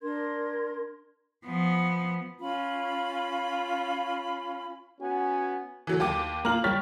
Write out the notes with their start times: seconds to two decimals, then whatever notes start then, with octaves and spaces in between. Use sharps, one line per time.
0.02 D4 A#4 C6 G#6
1.45 F3 B3
2.40 C#4 F4 B5
5.01 B3 C#4 F#4 G#5
5.87 E3 F#3 A3
6.00 D#2 G4 D6
6.45 A#3 F4 A#5 F6 F#7
6.64 G3 G4 C#5 F6 A6 B6